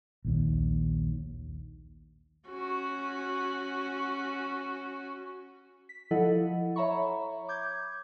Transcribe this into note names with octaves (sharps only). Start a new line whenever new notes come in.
A#1 D#2
C#4 F#4
B6
F3 E4 A4 D#5 F#5
C#5 E5 A#5 B5 C#6
D6 G6 G#6